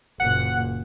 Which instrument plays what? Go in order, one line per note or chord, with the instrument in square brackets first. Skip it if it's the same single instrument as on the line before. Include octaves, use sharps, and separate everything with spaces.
[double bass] F#1 A#2 [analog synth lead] F#5